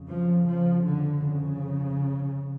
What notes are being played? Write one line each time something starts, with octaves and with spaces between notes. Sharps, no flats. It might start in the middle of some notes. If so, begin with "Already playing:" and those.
Already playing: F2 C#3
F3
F3
D3
C#3